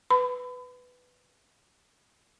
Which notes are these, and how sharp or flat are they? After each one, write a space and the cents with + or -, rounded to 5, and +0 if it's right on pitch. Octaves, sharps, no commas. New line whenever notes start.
B4 +10 B5 +35